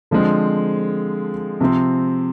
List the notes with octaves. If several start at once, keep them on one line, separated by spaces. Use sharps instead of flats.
D3 F3 G#3 C4
C3 F3 C4